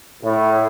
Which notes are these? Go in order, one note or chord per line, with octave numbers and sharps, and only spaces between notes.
A2